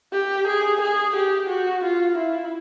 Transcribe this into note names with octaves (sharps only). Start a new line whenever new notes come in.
G4
G#4
G#4
G4
F#4
F4
E4